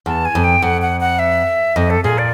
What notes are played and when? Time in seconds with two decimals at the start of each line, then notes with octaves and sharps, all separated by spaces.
0.06 E2 A5
0.25 G#5
0.35 F2
0.44 G5
0.62 F2 F#5
0.82 F#5
1.00 F#5
1.19 E5
1.76 F2 D#5
1.90 A4
2.03 A#2 G#4
2.18 D5